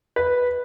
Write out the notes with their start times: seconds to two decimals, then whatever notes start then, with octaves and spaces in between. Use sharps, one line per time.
0.16 B4